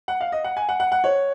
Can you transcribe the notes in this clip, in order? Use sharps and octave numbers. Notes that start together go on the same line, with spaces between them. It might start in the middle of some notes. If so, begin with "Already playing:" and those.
F#5
F5
D#5
F#5
G#5
F#5
F#5
F#5
C#5